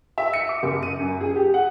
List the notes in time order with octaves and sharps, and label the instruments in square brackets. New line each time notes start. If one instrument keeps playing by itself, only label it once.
[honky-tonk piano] E5
C#7
D6
F#1
D#7
F#2
G#4
G4
F#5